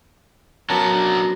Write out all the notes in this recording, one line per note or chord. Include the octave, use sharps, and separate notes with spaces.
F#2 F#3 B3 A5 A#5
D4